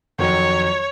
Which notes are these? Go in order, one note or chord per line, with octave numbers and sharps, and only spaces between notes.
F2 D#3 F#3 C#5